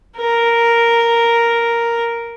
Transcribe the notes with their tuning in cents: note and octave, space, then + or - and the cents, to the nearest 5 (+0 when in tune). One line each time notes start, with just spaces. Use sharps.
A#4 +0